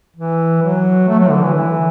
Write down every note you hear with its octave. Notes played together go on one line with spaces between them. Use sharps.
E3
F#3
A3
F#3
D3
E3
E3